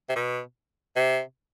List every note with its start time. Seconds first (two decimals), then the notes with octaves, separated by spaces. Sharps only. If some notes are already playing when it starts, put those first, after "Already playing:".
0.09 C3
0.16 B2
0.96 C3